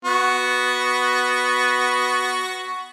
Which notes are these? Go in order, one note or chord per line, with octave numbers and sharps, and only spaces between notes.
B3 F#4